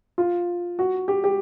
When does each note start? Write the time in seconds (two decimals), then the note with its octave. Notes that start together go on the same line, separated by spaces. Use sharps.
0.18 F4
0.79 F#4
1.08 G4
1.24 G4